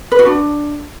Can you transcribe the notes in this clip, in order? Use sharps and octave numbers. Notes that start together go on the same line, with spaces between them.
B4
F#4
D4